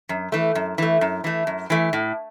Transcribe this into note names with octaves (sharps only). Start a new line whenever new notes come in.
F#2
E3 A3
F#2
E3 A3
F#2
E3 A3
F#2
E3 A3
A2